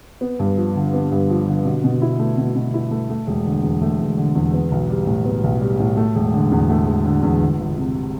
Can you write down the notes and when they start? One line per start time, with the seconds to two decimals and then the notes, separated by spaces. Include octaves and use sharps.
0.21 B3
0.40 G2
0.57 F3
0.75 D3
0.94 B3
1.12 G2
1.30 F3
1.47 D3
1.65 B2
1.84 B2
2.02 E4
2.19 A3
2.38 B2
2.56 B2
2.74 E4
2.91 A3
3.10 A3
3.27 E1
3.46 D3
3.63 E2
3.82 A3
3.99 E1
4.18 D3
4.35 E2
4.54 B3
4.72 B1
4.90 G3
5.07 A2
5.25 B3
5.44 B1
5.61 G3
5.80 A2
5.97 A3
6.15 E1
6.34 D3
6.52 E2
6.70 A3
6.87 E1
7.06 D3
7.23 E2
7.41 G1
7.60 G1
7.77 C3